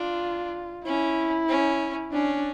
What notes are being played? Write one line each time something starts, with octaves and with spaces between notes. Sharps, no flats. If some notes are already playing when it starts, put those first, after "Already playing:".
Already playing: D4 F4
C#4 E4
C#4
C#4 D4